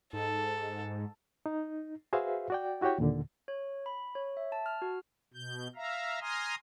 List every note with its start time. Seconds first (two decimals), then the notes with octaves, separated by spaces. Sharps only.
0.13 G#2 A4
1.46 D#4
2.13 F#4 G#4 B4 C5 E5 F5
2.50 F#4 D5 G5
2.81 E4 F#4 G4 C#5 G5
2.98 D#2 A#2 D3
3.48 C#5
3.86 B5
4.15 C#5
4.37 E5
4.52 A5
4.66 F6
4.82 F#4
5.34 B2 G6
5.76 E5 F5 A#5
6.21 G#5 A#5 C6 D#6 F6